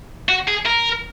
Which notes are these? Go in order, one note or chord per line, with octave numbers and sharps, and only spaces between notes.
F#4
G#4
A#4